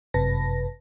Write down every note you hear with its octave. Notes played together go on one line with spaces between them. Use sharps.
G1 F#2 C3 B4 A5 A#6